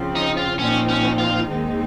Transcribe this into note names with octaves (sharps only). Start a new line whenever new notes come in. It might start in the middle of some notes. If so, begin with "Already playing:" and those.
Already playing: C#3 F3 C4
D#4
F4
A#2 F3 C4 C#4 D#4
C#4
F4
D#2 D#3 G#3 C4 D#4